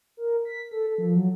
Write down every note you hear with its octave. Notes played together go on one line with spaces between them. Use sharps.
A#4
B6
A4
A4
F3
F#3